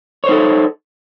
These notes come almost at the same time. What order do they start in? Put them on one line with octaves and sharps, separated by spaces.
C#5 C5 D#4 A4